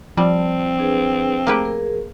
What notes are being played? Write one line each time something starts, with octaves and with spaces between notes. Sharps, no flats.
F3 G3 C4 A5
D4 G#4 B4
A3 A#3 G4 G#4 B4
G#4 A#4